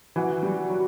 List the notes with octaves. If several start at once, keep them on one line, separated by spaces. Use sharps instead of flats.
E3 F#4
G3
F#3